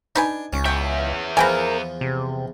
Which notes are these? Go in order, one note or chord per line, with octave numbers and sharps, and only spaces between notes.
D4 D#4 B4 G#5
C#2 C#4
B3 E5 G5
E2 F3 A#4 B4 G5 G#5
C3